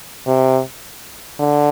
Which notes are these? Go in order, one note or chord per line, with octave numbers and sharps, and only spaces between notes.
C3
D3